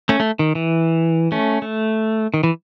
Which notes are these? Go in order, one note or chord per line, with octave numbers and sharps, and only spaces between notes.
A3 C#4
A3
D#3
E3
A3 C#4
A3
D#3
E3